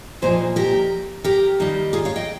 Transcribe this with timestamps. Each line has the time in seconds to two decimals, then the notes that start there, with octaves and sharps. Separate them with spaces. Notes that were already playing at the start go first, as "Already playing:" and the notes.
0.22 A#2 F3 A#3 D#4 G#4 C5
0.56 G4 A#4
1.24 G4 A#4
1.60 D#3 G3 A#3 D#4
1.93 F4 G#4
2.05 C#5 F5
2.16 D#5 G5